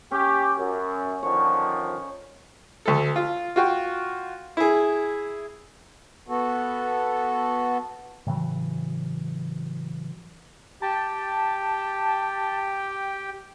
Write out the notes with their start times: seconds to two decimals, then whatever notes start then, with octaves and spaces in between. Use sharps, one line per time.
0.11 C#4 G4
0.58 F#2
1.23 D3 D#3 F3 C#5
2.86 D2 A4
3.16 F4
3.56 F4 F#4 G5
4.57 E4 G#4
6.28 B3 F#4 A4
8.27 A2 C#3 E3 F#3
10.82 G4 G5 A5